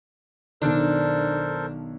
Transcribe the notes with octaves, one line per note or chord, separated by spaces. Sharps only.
B1 D#3 D4 A4 A#4 C5